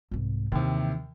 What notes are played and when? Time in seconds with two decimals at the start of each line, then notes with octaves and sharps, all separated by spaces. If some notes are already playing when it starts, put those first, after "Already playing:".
0.11 C2 G#2
0.52 D#2 C3 E3